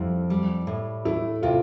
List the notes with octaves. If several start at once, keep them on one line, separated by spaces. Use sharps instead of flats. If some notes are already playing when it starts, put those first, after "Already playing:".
Already playing: F2 G3 E4
G3
A2
A3 E4
C3 F4